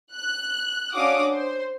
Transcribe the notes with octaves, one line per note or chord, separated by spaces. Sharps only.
F#6
C#4 D4 F#4 F5 D6 D#6
C5